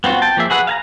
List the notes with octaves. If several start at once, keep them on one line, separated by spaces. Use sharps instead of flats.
B3 C4 F4 F#4
G5 A5
F3 A#3 G#4 E5
F#4 G#4 B4 F#5
F5 G#5 A#5